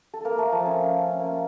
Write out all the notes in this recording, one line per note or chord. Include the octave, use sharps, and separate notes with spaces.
A4
A#3 A#4
A3 A4
F3 F4
C#4
C#4
A#3